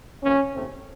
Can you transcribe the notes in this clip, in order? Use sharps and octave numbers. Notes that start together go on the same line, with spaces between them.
F2 C#3 F3 A#3 C#4
D#2 C#3 A3 C4